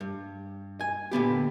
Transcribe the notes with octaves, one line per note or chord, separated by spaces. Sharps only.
G2
G#5
A#2 D3 B3 G4